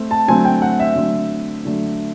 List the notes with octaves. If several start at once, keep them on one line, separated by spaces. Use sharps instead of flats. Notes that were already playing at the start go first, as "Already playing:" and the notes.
Already playing: A3 C4
A5
D3 F#3 A3 C4 G#5
G5
F#5
E5
D3 F#3 A3 C4
D3 F#3 A3